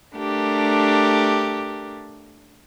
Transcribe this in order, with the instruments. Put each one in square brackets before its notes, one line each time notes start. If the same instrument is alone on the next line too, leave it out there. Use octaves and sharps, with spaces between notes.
[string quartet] A3 D4 G4 A#4